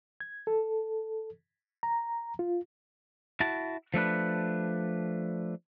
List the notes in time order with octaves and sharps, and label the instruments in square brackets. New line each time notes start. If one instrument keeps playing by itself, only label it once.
[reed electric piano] G#6
A4
A#5
F4
[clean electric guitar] E4 F#4 A5
F3 A3 D4 B4